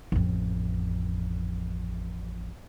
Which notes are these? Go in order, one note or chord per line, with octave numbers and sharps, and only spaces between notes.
A1 F2